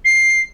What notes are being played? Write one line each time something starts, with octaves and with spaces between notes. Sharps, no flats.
C7